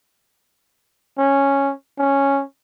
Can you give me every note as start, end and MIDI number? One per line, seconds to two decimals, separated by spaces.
1.18 1.73 61
1.98 2.42 61